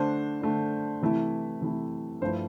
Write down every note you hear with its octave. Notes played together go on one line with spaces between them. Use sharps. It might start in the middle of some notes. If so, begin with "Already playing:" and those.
Already playing: D3 A3 D4 C5
D3 A3 D4
C3 E3 A3 E4
C3 E3 A3 E4
G2 F3 A3 E4 C5